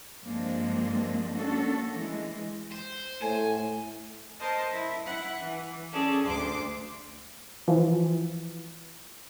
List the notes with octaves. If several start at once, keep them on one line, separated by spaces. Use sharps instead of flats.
G2 F3 G#3 A#3 C4 D4
A#3 C#4 D4 F#4 A4
E3 G#3
C5
A2 A3 G#5
A#4 C5 D#5 A5
E4
E4 F#5
E3
C#4 G#4 A4 D5
D2 C6 D6
E3 F3